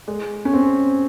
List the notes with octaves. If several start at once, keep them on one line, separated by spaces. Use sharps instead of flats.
G#3
C#4
C4